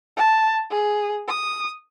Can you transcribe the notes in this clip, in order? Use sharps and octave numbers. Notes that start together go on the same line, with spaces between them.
A5
G#4
D#6